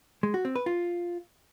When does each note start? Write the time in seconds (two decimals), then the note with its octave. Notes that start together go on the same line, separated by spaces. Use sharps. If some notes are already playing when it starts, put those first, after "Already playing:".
0.23 G#3
0.34 F#4
0.45 C4
0.56 B4
0.66 F4